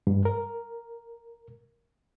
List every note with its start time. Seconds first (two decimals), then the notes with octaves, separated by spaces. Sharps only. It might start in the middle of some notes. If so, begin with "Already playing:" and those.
0.07 G2
0.25 A#4